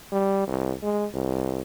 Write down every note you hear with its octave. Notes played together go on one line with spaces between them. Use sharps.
G3
C2
G#3
C2